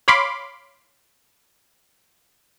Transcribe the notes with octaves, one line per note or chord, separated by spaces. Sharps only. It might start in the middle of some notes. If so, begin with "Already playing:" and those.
C#5 F5 B5 C6 D6